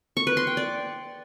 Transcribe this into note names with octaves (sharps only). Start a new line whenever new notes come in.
C#6
B4
C6
G5
D5